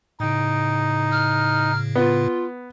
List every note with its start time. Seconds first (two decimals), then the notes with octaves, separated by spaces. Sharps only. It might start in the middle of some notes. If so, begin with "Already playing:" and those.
0.20 A2 C#3 D#4 G5
1.11 F6
1.95 B3 F4